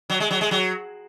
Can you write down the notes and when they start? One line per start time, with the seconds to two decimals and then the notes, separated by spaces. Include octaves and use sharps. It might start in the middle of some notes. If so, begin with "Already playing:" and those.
0.10 F#3
0.20 G#3
0.31 F#3
0.41 G#3
0.51 F#3